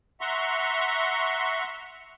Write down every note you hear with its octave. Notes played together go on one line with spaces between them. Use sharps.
E5 F#5 A#5 C6 C#6